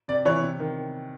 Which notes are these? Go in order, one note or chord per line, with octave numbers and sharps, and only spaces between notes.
C3 D5
E3 C#5
C3
D#3